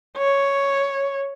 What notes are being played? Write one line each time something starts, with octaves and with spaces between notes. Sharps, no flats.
C#5